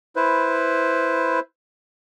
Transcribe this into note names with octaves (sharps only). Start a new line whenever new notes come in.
E4 B4 C5